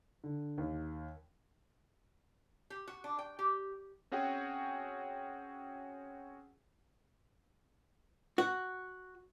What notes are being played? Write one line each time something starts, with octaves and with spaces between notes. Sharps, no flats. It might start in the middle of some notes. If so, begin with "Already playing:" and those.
D3
D#2
G4
F#4
D4
G5
G4
C4 C#4 F#4 G#4 F#5 G5
F#4